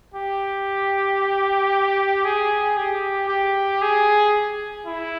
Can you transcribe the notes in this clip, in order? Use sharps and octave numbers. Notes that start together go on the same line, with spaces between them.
G4
G#4
G4
G4
G#4
E4